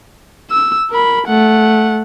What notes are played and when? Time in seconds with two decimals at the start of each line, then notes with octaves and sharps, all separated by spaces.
0.51 E6
0.91 A#4 B5
1.27 A3 F#5